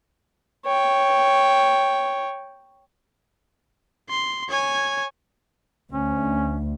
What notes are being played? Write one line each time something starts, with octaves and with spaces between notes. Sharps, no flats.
C#5 G5
C6
C#5 G#5
D2 C#4